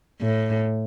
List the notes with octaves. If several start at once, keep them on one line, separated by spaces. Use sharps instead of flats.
A2